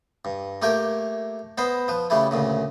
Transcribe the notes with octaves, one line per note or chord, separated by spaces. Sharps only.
G2
A3 A#3 G4 A#4 G5 G#5
B3 C5 D#5 B5
F3 B4
C#3 G3 A3 E4
D2 A#2 C#3